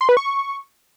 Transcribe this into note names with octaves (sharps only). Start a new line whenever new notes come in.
C6
B4
C#6